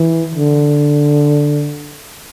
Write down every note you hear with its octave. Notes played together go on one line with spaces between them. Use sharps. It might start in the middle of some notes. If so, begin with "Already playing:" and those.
Already playing: E3
D3